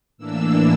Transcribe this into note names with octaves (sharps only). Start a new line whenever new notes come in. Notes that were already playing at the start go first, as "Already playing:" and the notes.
A2 E3 A#3 D4 E6